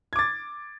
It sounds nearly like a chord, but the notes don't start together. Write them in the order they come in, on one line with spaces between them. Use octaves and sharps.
G#6 D6 A6